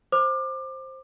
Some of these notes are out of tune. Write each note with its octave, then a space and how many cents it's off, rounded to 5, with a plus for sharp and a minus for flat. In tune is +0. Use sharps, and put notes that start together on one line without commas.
C5 +10 D6 +25